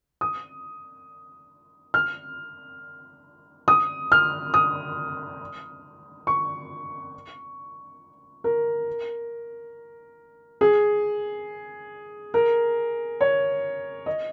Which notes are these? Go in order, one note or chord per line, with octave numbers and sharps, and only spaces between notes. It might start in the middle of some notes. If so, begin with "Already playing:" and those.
D#6
F6
D#6
F6
D#6
C#6
A#4
G#4
A#4
C#5
D#5